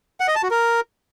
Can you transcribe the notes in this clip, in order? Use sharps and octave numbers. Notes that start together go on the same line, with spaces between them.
F#5
D#5
A5
F#4
A#4